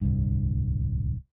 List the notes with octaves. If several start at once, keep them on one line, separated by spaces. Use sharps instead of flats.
D1 C2 G2